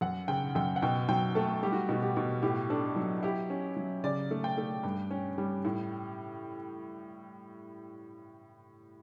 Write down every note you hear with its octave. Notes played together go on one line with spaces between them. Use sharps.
F#2 F#5
C#3 G5
F#2 G5
F#5
B2 G5
F#3 G5
A3 A4
G3 G4
F#4
B2 F#4
G4
B2
A2 G4
D4 A4
F#3
E4 G4
C#4
F#3
C#3 D5
A3
G5
A3
G2
C#4
G3
A2